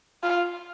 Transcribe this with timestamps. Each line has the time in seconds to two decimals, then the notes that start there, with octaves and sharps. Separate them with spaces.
0.23 F4